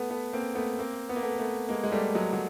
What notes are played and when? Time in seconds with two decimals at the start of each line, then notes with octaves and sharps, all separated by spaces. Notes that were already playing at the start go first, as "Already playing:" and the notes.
Already playing: A3 B3
0.10 A3 B3
0.33 A#3 C4
0.55 A3 B3
0.79 A#3 C4
1.09 B3
1.16 A#3
1.23 A3 B3
1.39 A3 B3
1.69 G#3 A#3
1.84 G#3
1.91 G3 A3
2.15 F#3 G#3
2.33 F#3